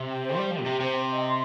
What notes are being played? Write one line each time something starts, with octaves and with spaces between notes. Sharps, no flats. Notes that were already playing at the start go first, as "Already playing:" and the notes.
Already playing: C3
G5
C5
G3 G4
F3 G4
A#2
C3 G5
C3 C5
G5
D#5
C6